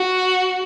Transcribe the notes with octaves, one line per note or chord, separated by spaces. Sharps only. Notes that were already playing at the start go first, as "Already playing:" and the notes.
Already playing: F#4